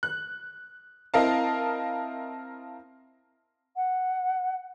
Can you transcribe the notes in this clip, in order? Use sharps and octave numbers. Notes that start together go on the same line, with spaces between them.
F#6
C4 E4 A#4 D#5 F5 A5
F#5